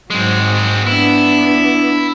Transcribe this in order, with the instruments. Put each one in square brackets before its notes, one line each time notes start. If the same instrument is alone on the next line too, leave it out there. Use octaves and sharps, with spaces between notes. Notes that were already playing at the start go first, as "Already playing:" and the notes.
[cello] G#2 F#3 [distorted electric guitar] G#3 C4
[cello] B3 D4 [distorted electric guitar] E4